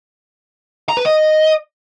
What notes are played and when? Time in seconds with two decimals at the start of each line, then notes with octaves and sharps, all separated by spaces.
0.89 A#5
0.97 B4
1.05 D#5